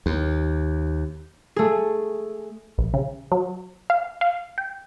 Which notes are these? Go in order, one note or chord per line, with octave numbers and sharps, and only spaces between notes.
D#2
A3 G#4
A#1
C#3
F#3
F5
F5
G5